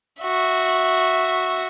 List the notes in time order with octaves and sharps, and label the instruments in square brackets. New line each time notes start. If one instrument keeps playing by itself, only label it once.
[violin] F#4 E5